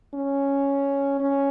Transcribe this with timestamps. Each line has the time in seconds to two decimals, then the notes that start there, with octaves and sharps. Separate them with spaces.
0.14 C#4
1.20 C#4